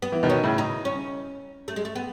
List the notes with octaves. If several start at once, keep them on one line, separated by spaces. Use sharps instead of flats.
B3
E3
B2 D#3
C#4
A2 C#3
D#4
C#4
A3
G#3
A3
B3